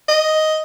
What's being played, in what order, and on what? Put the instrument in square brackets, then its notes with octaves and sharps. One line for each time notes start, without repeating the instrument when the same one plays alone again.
[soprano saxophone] D#5